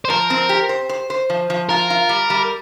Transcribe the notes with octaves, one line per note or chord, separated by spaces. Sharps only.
C5
F3 A#4
C4
G4
C5
C5
C5
F3
F3
F4 A#4
F4
G3
G3